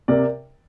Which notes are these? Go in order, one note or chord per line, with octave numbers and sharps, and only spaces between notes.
C3 A#4 D5